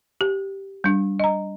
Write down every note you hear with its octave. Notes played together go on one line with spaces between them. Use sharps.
G4
G3 D4
D#5 A#5